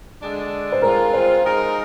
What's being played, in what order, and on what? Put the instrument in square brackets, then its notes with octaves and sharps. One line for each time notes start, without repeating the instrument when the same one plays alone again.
[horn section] D3 G#3 D4
[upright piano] C5
[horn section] G#3 C4 F4 [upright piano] A#4
[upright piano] C5
[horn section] G#3 D#4 A#4